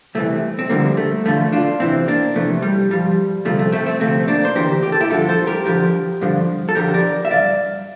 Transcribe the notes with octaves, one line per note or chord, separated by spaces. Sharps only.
C2 C3 E3 A3
C4
D2 D3 F3 G3 A#3
A3
E2 D3 F3 A3
D4 F4
E2 C3 E3 C4 E4
A#3 D4
F2 C3 E3 A3
G3
G2 F3 G3
D2 C3 F3 A3
A3
A3 C4
A3 C4
D2 C3 F3 A3 C4
A#3 D4
C5
D2 C3 E3 G4 A#4
G4
A4
E4 G4
G2 D3 F3 F4 A4
A4 C5
G4 A#4
F2 D3 F3 G4 A#4
G2 D3 F3
A4
F2 D3 F3 G4 A#4
A#4 D5
E5
G2 E3 D5 F5